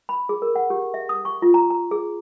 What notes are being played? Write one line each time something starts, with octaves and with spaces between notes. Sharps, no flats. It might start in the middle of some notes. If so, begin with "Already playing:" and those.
B5
G#4
A#4
F#5
G4
E5
D#6
C#6
F4
A#5
A#5
G#4